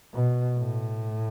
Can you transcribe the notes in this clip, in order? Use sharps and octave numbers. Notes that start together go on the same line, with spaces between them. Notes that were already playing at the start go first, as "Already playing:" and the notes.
B2
A2